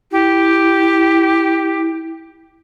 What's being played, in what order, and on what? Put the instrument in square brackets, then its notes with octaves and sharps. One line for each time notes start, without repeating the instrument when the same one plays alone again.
[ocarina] E4 [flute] G4